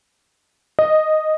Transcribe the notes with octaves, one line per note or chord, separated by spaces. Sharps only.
D#5